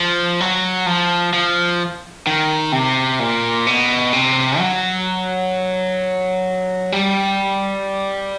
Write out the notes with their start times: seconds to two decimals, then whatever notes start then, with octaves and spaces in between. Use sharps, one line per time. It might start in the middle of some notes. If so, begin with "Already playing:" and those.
Already playing: F3
0.40 F#3
0.86 F3
1.33 F3
2.27 D#3
2.72 C3
3.20 A#2
3.67 B2
4.13 C3
4.59 F#3
6.92 G3